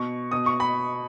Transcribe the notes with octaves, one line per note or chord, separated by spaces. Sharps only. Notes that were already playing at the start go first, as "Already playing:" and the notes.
Already playing: B2 C#6
B2 D#6
C#6
B5